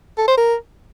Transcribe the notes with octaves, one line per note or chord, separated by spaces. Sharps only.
A4
C5
A#4